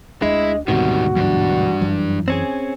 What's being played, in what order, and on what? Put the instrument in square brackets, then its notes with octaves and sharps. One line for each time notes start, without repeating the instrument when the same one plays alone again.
[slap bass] D2 D4 [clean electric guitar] G#3 [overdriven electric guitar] E4 [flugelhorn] D#5
[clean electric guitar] D2 G#2 B2 [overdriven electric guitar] D#3 G3 [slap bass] C4 [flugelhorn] F#4
[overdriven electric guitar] G2 D4 [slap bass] E3 F#3
[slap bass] F#2 E3 F#3
[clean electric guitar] C4 C#4 G#4